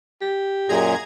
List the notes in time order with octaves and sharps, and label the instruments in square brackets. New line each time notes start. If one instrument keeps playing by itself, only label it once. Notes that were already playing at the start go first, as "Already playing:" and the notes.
[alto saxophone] G4
[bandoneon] F#2 A#2 [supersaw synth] G#4 A#5 G#6